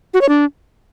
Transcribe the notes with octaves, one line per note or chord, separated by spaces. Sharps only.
F#4
C#5
D4